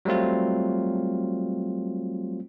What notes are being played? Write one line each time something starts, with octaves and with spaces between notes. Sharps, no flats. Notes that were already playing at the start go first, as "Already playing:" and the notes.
F#3 G3 A3 C4 F4